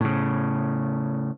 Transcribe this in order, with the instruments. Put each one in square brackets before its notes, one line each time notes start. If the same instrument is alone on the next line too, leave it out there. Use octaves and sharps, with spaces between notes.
[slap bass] A2 C#3